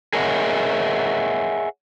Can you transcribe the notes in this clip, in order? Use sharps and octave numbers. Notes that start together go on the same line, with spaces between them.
G#4 A#4 C#5 D#5 E5 F#5